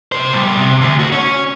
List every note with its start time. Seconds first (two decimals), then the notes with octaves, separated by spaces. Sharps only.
0.12 C3 C5
0.33 B2 G3
0.57 C3
0.81 D2
1.00 A3 F#4
1.12 C#4 C#5